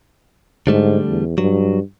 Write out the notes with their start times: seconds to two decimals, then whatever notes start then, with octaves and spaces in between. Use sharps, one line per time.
0.67 G#2 D3 G3 A3
1.08 E2
1.38 G2 F#3